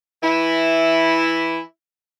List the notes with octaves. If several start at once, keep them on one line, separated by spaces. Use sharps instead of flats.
E3 E4